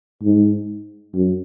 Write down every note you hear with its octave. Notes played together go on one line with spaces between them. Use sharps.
G#2
F#2